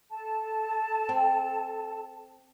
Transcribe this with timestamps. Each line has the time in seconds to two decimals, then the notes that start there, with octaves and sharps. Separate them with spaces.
0.11 A4 A5
1.09 C4